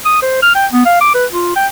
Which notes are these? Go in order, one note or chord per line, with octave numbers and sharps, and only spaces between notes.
D#6
C5
F6
G5
B3
F5
D6
B4
F4
G5